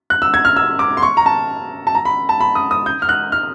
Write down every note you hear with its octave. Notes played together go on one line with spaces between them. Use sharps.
F#6
E6
G#6
F6
E6
D6
C6
C#6
A#5
A5
A5
A#5
B5
A5
B5
D#6
D#6
G6
F6
F#6
F6